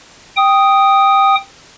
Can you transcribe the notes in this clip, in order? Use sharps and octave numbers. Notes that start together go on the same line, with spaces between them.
G5 D#6